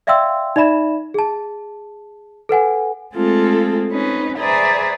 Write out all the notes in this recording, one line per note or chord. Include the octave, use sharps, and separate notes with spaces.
D5 E5 F5 G5 C6 E6
D#4 D5 E5 B5 E7
G#4 A5
A4 B4 F#5 G#5
G#3 A3 C4 F4 G#4 A4
C4 C#4 D#4 B4
G#4 B4 C5 D5 E5 A#5